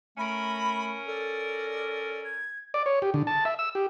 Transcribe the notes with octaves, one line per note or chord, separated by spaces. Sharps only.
A3 C#4 A#4 B5
A4 D5
G#6
D5
C#5
G4
D3
A5
E5
E6
G4